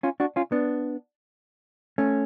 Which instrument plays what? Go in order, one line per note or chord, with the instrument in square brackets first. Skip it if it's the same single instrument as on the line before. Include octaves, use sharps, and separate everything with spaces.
[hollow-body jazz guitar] C#4 F4
D4 F#4
C#4 F4
B3 D4
A3 C#4